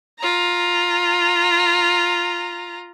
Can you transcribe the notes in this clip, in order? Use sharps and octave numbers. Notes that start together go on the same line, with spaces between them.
F4 A#5